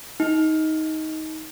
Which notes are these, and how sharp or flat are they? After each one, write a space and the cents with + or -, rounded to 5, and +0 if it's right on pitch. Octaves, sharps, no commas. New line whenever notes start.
D#4 +15